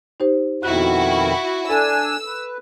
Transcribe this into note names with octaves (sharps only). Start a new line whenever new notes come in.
D#4 G4 C5
F2 B2 D#3 E4 F#4 F#6
D4 A4 G#5 E6
B4